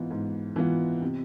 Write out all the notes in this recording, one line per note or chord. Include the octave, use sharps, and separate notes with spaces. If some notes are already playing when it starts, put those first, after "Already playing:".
Already playing: G#2 E3 B3 F4
G#2
E3 B3 F4
C3